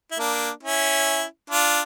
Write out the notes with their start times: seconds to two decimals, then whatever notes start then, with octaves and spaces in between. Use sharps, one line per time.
0.11 E4
0.19 A#3 D4
0.63 C#4 E4
1.50 D4 F4